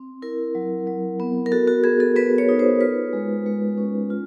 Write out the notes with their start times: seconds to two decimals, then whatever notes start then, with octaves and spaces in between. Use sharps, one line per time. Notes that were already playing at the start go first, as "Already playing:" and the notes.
Already playing: C4
0.22 E4 A#4
0.55 F#3
0.87 F#3
1.20 B3
1.46 A#4
1.52 F#4 A4
1.68 F#4
1.84 B3 G#4
2.00 A4
2.16 B3 B4
2.38 C#5
2.49 D#4
2.59 C5
2.81 F4 B4
3.13 G#3
3.46 G#3
3.78 C#4
4.10 F4